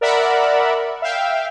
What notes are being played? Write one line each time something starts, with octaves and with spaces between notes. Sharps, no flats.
A#4 D5 E5 F#5 B5
E5 F5 G5